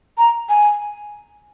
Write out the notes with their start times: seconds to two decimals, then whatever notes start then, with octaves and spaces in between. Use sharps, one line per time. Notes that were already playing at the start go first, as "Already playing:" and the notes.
0.18 A#5
0.49 G#5